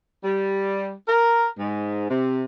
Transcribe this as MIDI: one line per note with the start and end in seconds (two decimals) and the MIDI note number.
0.23 0.92 55
1.07 1.47 70
1.58 2.09 44
2.09 2.44 48